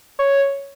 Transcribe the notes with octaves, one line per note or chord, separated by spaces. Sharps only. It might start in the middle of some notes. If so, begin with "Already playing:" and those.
C#5